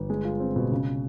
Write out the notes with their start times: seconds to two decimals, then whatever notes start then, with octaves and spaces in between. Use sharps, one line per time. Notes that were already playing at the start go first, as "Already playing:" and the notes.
Already playing: G1
0.10 G#3
0.25 F4
0.40 C4
0.56 B2
0.72 C#3